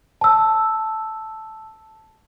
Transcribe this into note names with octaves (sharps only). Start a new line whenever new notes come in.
A5 E6